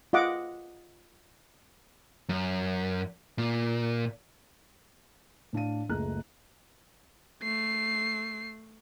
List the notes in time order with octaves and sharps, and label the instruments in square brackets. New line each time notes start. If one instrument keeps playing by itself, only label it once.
[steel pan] F4 D#5 F#5 D6
[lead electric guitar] F#2
A#2
[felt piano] A2 D4 F5 D#7
F#1 C#2 A3 G#4 A#5 F#6
[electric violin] A3 C7